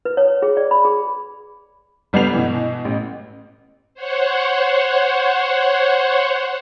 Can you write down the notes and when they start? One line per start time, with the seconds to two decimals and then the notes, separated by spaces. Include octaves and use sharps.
0.05 B4
0.17 C#5
0.42 G#4
0.57 D5
0.71 B5
0.85 G#4
2.13 G1 G3 B3 G6 C7 F7
2.33 B2 E3
2.85 A1
3.94 C5 C#5 F#5